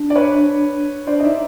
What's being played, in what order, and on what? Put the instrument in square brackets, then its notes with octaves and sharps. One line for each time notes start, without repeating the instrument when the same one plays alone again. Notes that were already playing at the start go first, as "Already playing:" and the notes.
Already playing: [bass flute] D4
[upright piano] D5
B4 C#5
[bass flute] D4 [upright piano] C5 D5
[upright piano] D#5
[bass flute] D#4 [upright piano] D5 E5